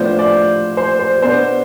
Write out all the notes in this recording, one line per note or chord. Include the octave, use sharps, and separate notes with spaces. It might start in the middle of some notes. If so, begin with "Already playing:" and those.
Already playing: A2 F3 B3 D4 C5
D5
C5
C5
B2 B3 D4 C5